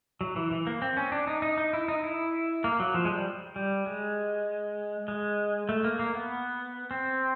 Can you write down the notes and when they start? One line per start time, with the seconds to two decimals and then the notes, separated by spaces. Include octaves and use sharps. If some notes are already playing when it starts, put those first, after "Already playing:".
0.21 F#3
0.36 E3
0.51 E3
0.67 A#3
0.82 C4
0.97 C#4
1.12 D4
1.27 D#4
1.42 D#4
1.58 D#4
1.73 E4
1.88 D#4
2.04 E4
2.64 A#3
2.80 F#3
2.94 F3
3.05 G#3
3.11 G3
3.56 G3
3.86 G#3
5.08 G#3
5.69 A3
5.84 A#3
5.99 A#3
6.15 B3
6.91 C4